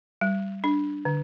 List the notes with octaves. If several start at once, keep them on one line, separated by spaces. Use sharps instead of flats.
G3
D4
D3